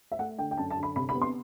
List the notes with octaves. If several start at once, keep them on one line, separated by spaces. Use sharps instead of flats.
E5
A3 F#5
D3 G5
G5
F#2 A5
A5
D3
B5
C3 B5
B5
B3
C6